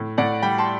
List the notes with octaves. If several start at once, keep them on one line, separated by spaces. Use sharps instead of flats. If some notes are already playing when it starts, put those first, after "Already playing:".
Already playing: A2
A2 D5 F#5
G3 G5 B5
A5 C6